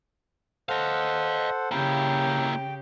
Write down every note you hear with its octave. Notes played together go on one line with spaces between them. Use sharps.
A4 C5 D#5 F5 F#5
C#3 A#3 E4 G4 G5